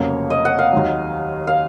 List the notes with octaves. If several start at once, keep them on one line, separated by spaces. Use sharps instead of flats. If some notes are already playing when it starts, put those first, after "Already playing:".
Already playing: F1 F2 C#3 F#3 A#3 C#5 F5
D#5
F#5
F5
D#2 D#3 F#3
F5